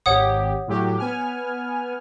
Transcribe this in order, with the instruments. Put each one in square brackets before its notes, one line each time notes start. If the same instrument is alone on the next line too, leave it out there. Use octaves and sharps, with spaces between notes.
[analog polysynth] G#1 G4 [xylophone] C#5 F#5 D#6
[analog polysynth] A2 F#3 G4
B3 G#5 F6